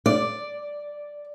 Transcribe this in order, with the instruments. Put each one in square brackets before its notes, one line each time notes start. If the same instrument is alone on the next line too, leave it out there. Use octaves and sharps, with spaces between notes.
[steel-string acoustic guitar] D5